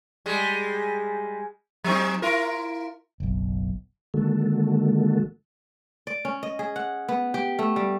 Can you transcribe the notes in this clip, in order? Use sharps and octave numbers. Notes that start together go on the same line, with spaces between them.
G3 G#3
F#3 C4 D#4
E4 F4 A#4
F#1 B1
D3 D#3 G#3 A#3 F#4 A4
D5
C#4
D#5
G#4
F#5
B3
G4
A3
G3